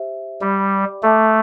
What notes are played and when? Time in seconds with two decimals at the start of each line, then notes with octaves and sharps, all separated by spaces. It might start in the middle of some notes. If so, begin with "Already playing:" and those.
Already playing: G4 C5 E5
0.41 G3 G4 D5 G5 B5 D6
1.03 A3 A4 E5 A5 D6